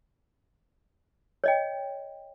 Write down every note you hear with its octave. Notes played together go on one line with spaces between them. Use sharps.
C#5 D#5 G5